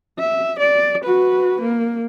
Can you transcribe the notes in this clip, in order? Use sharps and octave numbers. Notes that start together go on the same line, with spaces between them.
E5
D5
F#4 B4
A#3